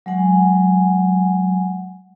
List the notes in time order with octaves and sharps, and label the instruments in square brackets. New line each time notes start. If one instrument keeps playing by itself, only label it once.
[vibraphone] F#3 G#3 F#5 G#5